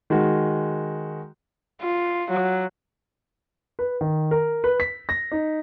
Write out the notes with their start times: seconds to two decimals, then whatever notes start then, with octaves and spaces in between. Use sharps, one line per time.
0.10 D#3 G#3 F#4
1.82 F4
2.31 F#3
3.79 B4
4.01 D#3
4.31 A#4
4.64 B4
4.80 B6
5.09 A#6
5.31 D#4